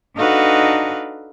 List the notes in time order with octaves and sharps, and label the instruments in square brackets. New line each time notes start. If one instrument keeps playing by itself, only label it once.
[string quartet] D4 D#4 F#4 A4 B4 F5